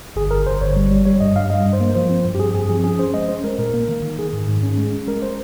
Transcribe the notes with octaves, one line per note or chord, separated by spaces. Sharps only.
G1 G#4
G1 A#4
G1 C5
G1 C#5
G3
G3
G3 C#5
G2 D#5
G2 F5
G3 D#5
G2
C5
A#3
F3 C5
C4
G2
G4
C4 G#4
G2 G#4
F3 G#4
C#4 G#4
C#4 C5
G#3 D#5
C#4 C5
G#3 A#4
A#2 A#4
A#3
D#3
D#3
D#3 G#4
G#2
G#2
C#4
G#3
C#4
G#3 A#4
C5